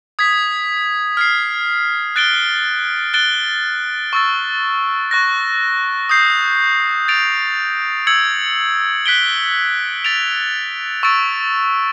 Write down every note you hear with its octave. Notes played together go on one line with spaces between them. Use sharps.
D#6 G#6 B6
F6 G#6 C7
F#6 A6 D7 G7
F#6 A6 D7 G7
C#6 E6 A6
C#6 F#6 A#6
D#6 G6 C7
A6 D7 F7
E6 G#6 C#7 F#7
F#6 B6 D7 G7
A6 D7 F7
C#6 E6 A6 D7